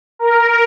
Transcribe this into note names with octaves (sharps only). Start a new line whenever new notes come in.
A#4